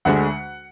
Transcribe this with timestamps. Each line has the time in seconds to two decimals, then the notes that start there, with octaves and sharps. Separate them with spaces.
0.05 D2 D3 G#3 F#5